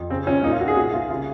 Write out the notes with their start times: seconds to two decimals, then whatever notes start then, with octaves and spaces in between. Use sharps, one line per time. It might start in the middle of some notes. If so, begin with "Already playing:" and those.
Already playing: F2
0.10 C#3 C4
0.26 C#2 C#4
0.43 A#2 D#4
0.52 F4
0.60 C2 F#4
0.68 G#4
0.76 A#2 F#4
0.93 C2 F4
1.10 C#3 F4